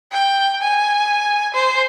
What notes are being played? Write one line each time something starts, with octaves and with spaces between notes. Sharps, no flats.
G5
G#5
C5